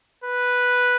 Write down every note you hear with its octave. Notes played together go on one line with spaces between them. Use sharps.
B4